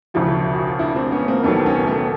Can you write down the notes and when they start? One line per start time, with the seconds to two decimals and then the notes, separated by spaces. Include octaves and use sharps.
0.14 E1 D2 C#3 F3 E4 F#4
0.53 F#4
0.67 F4
0.79 D4 E4
0.95 C4 D4
1.11 B3 C#4
1.28 A#3 C4
1.43 E1 D#2 D#3 F#3 A3 B3
1.66 B3 C#4
1.87 A3 B3